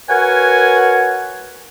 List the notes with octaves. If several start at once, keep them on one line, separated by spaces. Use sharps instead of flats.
F#4 A#4 B4 C#5 F#5 G#5